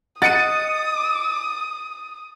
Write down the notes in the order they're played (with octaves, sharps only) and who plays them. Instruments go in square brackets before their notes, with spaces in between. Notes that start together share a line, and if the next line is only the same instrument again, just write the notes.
[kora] D#5 F#5 [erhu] D#6 [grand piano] A6 C#7 D#7